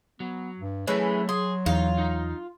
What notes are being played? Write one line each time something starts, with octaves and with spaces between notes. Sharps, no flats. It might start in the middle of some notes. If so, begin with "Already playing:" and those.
F#3 B3
G2
E3 F#3 G#3 A3 C#4
G#4 C6
E2 D#4 F4
D#4